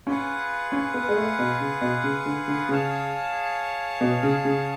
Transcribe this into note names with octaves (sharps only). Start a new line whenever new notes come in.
C#4 F4 G#4 B4 F#5
C#4
B3
G#3
A3
B2
C#3
B2
C#3
D3
D3
C#3 G#4 C#5 F5 A5
B2
C#3
C#3